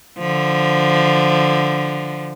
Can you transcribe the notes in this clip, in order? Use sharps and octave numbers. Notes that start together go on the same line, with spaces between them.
D3 F3